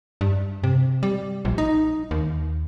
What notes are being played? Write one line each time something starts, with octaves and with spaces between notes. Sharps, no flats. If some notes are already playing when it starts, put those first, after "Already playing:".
G2
C3
G3
A#1
D#4
D#2